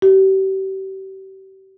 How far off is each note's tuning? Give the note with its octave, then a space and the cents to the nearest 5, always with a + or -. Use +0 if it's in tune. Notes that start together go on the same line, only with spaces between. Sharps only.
G4 -35